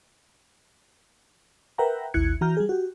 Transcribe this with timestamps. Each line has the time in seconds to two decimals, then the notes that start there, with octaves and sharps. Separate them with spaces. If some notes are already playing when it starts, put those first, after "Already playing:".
1.78 A#4 B4 E5 F#5 G5 A#5
2.14 A1 D#2 E4 F#6 G#6 C#7
2.41 E3 F#4 A#5 F6 G6
2.57 G3 G#4
2.69 F#4 G4